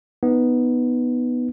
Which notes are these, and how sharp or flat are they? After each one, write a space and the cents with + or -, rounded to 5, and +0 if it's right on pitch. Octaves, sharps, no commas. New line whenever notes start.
B3 +0 D#4 -5